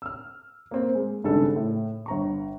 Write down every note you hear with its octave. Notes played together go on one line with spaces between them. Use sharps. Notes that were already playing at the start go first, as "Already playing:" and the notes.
E6 F6
A#3 C4
G#3
G#1 G2 C#3 A4
A2
G1 A#5 C#6